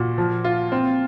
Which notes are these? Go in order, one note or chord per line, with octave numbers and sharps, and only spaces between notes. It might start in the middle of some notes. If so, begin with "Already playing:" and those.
Already playing: A#2 F#4
F3
F4
C4